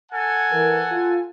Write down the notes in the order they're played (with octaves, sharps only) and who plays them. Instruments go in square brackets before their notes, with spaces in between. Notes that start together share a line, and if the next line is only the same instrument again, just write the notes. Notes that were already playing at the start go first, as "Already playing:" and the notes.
[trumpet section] A4 F#5 G#5
[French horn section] E3 A#4
F4